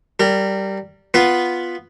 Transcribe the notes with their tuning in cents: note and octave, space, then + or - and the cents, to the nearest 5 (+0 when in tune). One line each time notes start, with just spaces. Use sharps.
G3 -10 A#4 -30
B3 +0 F4 +0 B4 +0